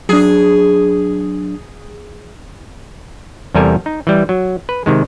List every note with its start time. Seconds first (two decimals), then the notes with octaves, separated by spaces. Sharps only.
0.09 F#3 D4 G#4
3.55 E2 C3 G3 A4 A#4 G#5
3.86 D#4
4.07 E3 G3
4.29 F#3
4.69 B4
4.86 C3 D#3 G#3